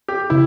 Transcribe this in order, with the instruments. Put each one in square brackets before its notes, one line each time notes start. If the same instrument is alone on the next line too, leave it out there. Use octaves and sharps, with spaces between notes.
[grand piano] G4
[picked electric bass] C#3 [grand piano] E4